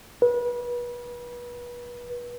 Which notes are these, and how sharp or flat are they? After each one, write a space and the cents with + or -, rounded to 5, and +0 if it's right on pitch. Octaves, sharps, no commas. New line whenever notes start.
B4 -30